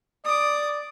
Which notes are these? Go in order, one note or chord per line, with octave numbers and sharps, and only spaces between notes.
D5 D6 D#6